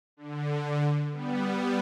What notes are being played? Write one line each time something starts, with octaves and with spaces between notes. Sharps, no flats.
D3
G3 B3
G3 B3